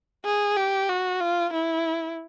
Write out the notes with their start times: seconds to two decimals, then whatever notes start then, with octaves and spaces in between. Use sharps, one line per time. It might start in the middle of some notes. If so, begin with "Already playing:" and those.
0.25 G#4
0.57 G4
0.89 F#4
1.20 F4
1.53 E4